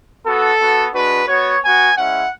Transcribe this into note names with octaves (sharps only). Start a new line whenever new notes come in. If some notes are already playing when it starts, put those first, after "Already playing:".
B3 F#4 A4
B3 F#4
G#3 D4 F#4 B4
B3 F#4 C#5
B3 F#4 G#5
G#3 C#4 E4 F#5